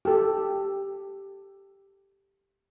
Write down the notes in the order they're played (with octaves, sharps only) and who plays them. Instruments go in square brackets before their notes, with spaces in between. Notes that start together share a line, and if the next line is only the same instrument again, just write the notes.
[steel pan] G4 A4